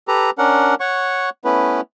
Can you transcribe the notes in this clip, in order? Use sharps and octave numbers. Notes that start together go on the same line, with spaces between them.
G4 A4 B4 A#5
C#4 D4 A#4 F#5
C#5 F#5 C#6
A3 B3 C#4 E4 B4